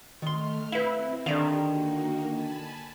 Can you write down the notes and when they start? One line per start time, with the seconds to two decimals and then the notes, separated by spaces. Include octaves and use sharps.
0.22 D#3 A3 C6 F6
0.72 C4 E4 B4 F5
1.26 D3 D#3 G4 D5 F5
1.60 A#3 D#4 F#4
2.27 G#5 A5 B5